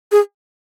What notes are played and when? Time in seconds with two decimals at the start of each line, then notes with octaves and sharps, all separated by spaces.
0.12 G#4